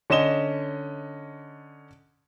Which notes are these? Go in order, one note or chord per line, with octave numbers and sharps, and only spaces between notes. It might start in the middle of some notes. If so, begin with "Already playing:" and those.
D3 C#4 D#5 E7 G7